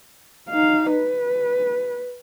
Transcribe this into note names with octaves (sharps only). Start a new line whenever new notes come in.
D#4 F5
B4